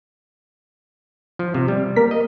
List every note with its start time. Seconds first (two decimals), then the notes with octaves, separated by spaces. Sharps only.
1.39 F3
1.54 C3
1.68 G3
1.96 A#3 A#4 B6
2.11 D#5